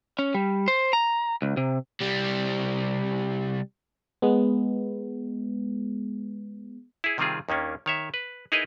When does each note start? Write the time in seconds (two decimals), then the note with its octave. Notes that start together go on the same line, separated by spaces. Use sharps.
0.19 C#4
0.34 G3
0.68 C5
0.93 A#5
1.42 C#2
1.57 C3
2.00 C3 G3
4.22 G#3 B3
7.04 E4 G#4
7.18 C3 D#3 G3 C4 F4 G#4
7.49 D#2 D#3 A#3 C#4 D4
7.86 D#3 C#5 E5
8.14 B4
8.52 D#4 E4 G#4 A#4 B4 D#5